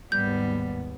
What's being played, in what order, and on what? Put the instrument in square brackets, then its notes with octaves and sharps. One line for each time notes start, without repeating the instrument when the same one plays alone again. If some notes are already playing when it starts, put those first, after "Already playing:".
[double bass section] D#2 G#2 B3 [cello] G3 [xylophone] G6